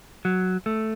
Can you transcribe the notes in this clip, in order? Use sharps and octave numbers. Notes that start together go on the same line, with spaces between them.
F#3
A3